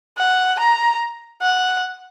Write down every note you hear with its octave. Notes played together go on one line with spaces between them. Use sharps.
F#5
A#5
F#5